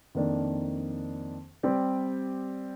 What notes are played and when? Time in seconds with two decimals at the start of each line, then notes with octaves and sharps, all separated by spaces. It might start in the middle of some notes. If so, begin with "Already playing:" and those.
0.15 F2 D#3 A#3 D4
1.63 G3 C4 G4 D5